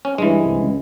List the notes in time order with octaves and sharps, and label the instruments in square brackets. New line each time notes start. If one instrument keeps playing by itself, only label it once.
[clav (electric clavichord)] C#4
[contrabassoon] G2 [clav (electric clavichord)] E3 G#3
[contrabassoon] C2
C#2